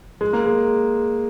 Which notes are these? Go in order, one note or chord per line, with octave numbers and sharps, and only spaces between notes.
G#3
A#3
G#3